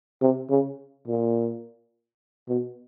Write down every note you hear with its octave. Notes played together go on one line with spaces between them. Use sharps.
C3
C#3
A#2
B2